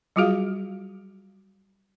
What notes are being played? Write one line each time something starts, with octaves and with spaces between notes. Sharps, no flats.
F#3 G3 F4 F#4 G#4 F5